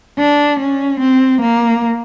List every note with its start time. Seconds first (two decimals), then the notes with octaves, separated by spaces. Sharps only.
0.18 D4
0.60 C#4
1.00 C4
1.41 A#3